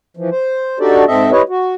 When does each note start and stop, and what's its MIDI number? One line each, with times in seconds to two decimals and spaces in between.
0.17 0.30 52
0.17 0.30 53
0.31 0.79 72
0.80 1.04 62
0.80 1.04 63
0.80 1.04 66
0.80 1.04 67
0.80 1.04 69
0.80 1.04 74
1.07 1.31 44
1.07 1.31 60
1.07 1.31 69
1.07 1.31 75
1.07 1.31 76
1.32 1.42 64
1.32 1.42 67
1.32 1.42 71
1.32 1.42 73
1.32 1.42 75
1.49 1.75 66